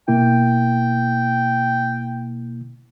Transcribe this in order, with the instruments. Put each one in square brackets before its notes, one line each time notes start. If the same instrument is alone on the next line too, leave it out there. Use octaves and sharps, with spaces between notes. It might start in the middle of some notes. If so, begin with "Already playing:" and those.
[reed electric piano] B2 A#3 E4 [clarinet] G5